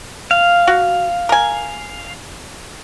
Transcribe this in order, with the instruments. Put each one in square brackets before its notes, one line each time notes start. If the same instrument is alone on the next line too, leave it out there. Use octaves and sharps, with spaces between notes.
[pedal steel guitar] F5
[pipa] F#4
A#4 G#5